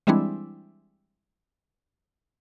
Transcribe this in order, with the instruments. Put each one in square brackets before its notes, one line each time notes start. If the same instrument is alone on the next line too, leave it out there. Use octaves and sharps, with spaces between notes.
[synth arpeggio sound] E3 G3 G#3 C4 D4 E4